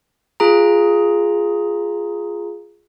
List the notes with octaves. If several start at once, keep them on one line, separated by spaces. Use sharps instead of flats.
F4 G#4 A#5